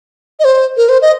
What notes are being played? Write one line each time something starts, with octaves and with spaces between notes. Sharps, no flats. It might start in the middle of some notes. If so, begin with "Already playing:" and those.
D#5
C5
A#4
C5
D#5